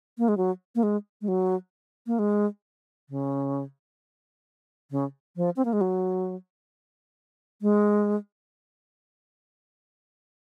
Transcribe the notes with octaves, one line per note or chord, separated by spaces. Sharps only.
A#3
G#3
F#3
A#3
G#3
G#3
F#3
A#3
G#3
C#3
C#3
F3
C4
A#3
G#3
F#3
G#3